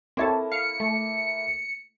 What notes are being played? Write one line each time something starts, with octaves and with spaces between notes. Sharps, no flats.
A#3 C4 E4 A4 C#5 A5
F5 C#7
A3